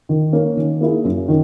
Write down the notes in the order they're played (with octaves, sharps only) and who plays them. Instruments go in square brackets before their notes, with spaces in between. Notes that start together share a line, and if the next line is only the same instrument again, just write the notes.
[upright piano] D#3
A#3 C#4
D#3
A#3 E4 G#4
F#2
D#3